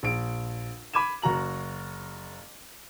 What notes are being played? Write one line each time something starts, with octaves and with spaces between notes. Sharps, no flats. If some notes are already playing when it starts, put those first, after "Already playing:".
A#1 D7
B5 D6 G#6 D#7 E7
F#1 F#4 A#5 F#7